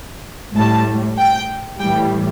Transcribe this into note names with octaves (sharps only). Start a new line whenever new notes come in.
A2 G3 A5
G5
A2 E3 G3 G5